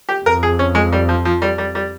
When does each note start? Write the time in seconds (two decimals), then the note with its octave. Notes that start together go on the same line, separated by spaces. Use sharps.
0.09 G4
0.26 F2 A#4
0.43 G#4
0.59 C#4
0.75 G#3
0.92 G3
1.09 F3
1.25 F3
1.42 G3
1.58 G3
1.75 G3